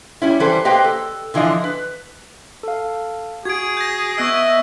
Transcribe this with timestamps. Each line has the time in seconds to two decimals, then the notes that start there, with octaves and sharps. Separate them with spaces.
0.22 G3 C#4 E4
0.40 E3 G3 A4 B4 C5
0.65 A#3 G4 B4 C5 D#5 G5
0.84 A4
1.34 D3 E3 F3 D4 D#5
1.64 B4
2.63 A4 F5
3.45 F#4 G#4 G#6 D7
3.77 G6 A#6
4.18 B3 D#5 E5 C#6 E6 F#6 D7